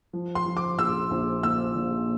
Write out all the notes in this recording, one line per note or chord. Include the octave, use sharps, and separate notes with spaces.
F3
C6
F3
D6
A#1 E6
A#1
A#2 E6
A#2